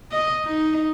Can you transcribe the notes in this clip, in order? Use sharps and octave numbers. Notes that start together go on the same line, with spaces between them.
D#5
D#4